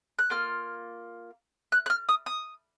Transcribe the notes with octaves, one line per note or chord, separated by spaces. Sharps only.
F#6
A#3 F4 F6
F#6
F#6
F6
D#6
D#6